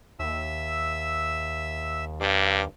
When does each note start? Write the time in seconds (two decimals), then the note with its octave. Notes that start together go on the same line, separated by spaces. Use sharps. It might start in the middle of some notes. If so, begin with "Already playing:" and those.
0.19 D#2 E5 E6
2.20 G2 F5 D6